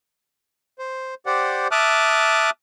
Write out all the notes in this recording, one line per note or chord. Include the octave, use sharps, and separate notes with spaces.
C5
G4 C5 D5 F#5
E5 A5 D6 D#6 F6 F#6